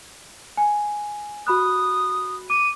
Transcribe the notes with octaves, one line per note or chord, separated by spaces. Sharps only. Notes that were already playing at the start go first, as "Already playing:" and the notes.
G#5
F#4 B5 D#6 F#6
D6 D#7